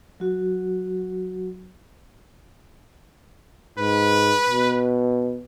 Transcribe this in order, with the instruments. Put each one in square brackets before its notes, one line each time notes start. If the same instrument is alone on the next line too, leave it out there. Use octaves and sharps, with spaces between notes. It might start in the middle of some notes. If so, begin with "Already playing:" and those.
[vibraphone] F#3 F#4
[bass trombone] G#2 [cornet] B4
[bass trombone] B2